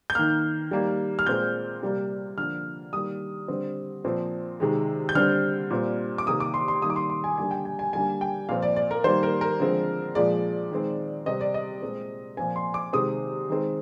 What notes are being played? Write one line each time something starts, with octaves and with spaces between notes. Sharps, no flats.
G6
D#3 A#3 F6
D#3 G3 A#3
F6
A#2 G#3 C4 G6
C3 G3 A#3
D3 F3 A#3 F6
D#3 G3 A#3 D#6
D3 G3 C4
A#2 F3 C4
C3 D#3 G#3
G6
D3 G3 C4 F6
A#2 G3 C4
D6
C3 D#3 A#3 D#6
D6
C6
C6
D#3 G3 A#3 D#6
D6
C6
C6
G#5
D3 G3 A#3 G#5
G5
G#5
G#5
D3 G3 A#3 G#5
G5
A#2 F3 C4 F5
D5
D5
A#4
D#3 G3 A#3 C5
A#4
A#4
D3 F3 G#3 C4
A#2 F3 G#3 D5
D#3 G#3 C4
C3 G3 C4 D#5
D5
D#5
A#2 G#3 C4
A#2 F3 C4 G#5
C6
D6
C3 D#3 G#3 C4 D#6
D#3 G#3 C4